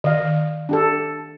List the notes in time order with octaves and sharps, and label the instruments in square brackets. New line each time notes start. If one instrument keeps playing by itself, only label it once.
[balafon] D#3 [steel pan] D#5 F5
[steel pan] D4 G4 A4